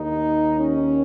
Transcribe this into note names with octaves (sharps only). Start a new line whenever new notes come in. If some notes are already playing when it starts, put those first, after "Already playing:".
Already playing: D#2 D#3 D#4
C#4